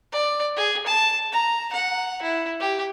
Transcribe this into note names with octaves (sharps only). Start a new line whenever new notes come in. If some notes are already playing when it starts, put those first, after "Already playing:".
D5
G#4
A5
A#5
F#5
E4
G4